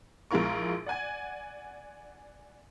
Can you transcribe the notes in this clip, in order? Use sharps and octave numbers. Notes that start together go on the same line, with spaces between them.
A#1 G#3 E4 F4 A#4 C#6
D5 F#5 G#5 G#6